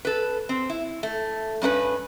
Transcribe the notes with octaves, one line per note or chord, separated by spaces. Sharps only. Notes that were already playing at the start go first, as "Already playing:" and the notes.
A4 B4
C4
E4
A3
G2 C#4 D4 B4